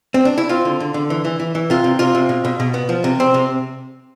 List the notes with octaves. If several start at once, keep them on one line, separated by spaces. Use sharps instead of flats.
C4
D4
E4
C4 F4
D3
D3
D3
E3
E3
E3
E3
C3 F4
C3
C3 F4
C3
B2
B2
B2
B3
F3
C3
C4
C3